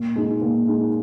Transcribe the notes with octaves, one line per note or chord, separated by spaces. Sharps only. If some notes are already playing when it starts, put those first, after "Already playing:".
Already playing: A#2
G#3 D#4
A#2
G#3 D#4